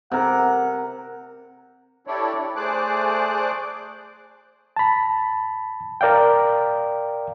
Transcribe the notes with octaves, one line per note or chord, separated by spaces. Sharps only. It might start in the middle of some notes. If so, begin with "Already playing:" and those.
C3 A#4 F#5
D4 E4 G4 A4 C#5 D5
E4
A3 G#4 C5 D5 D6 F#6
A5 B5
A#4 D5 F5 G5